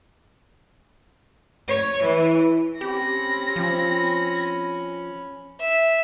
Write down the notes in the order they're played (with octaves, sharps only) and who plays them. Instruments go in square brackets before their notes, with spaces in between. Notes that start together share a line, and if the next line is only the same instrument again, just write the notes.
[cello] C#5
E3
[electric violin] C4 A#6 [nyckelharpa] C#4 B5 [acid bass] G4
[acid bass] F3
[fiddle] E5